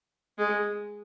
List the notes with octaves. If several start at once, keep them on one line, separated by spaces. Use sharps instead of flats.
G#3